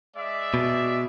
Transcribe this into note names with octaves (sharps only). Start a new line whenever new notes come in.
G#3 D5 E5
B2